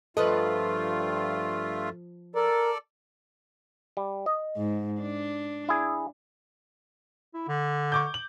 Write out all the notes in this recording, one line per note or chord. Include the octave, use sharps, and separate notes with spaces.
G2 F3 A3 F4 A4 B4 D#5
A4 A#4 D5
G3
D#5
G#2
D4
E4 G#4
E4
D3
C#6 D6 G6
F#7